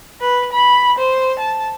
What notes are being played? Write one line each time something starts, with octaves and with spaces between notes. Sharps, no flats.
B4
B5
C5
A5